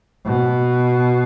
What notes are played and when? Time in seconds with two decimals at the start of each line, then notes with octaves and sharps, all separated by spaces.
0.25 B2